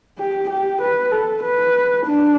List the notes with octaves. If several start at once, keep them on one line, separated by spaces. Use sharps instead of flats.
G4
G4
B4
A4
B4
D4